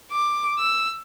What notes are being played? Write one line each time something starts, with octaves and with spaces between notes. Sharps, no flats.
D6
E6